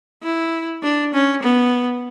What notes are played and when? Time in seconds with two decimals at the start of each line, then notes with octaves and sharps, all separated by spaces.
0.23 E4
0.83 D4
1.13 C#4
1.43 B3